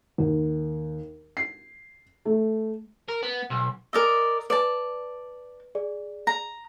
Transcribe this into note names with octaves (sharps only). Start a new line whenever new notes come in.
D#2
C7
A3
A#4
B3
B1
A#4 D5 D#5 E6
B4 D5 A5
G#4 D5
A#5